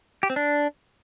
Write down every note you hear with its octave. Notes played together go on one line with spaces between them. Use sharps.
G4
C4
D4